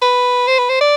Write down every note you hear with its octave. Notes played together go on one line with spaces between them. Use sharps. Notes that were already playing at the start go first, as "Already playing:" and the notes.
B4
C5
B4
C5
D5